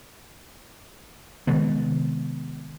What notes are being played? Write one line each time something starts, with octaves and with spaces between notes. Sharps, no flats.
C3 D#3 G#3 B3